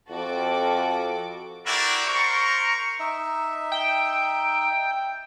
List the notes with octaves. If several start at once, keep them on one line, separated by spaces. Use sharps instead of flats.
F2 F#4 A4 D6
D4 E4 F#4 G4 A#4 D5
A#4 C5 A#5 C#6
D#4 E5
G5